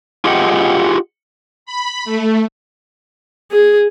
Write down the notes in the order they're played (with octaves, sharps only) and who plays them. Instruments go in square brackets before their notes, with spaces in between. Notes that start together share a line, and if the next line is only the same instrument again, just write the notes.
[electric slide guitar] F4 G4 G#4 D#5 F#5 G5
[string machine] B5
A3
[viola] G#4